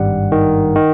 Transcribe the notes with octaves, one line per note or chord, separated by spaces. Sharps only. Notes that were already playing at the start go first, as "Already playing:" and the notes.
Already playing: G#1 G2 G3 F#5
D#3
D#3